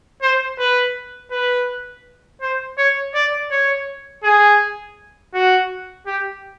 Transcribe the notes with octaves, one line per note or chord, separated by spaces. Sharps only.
C5
B4
B4
C5
C#5
D5
C#5
G#4
F#4
G4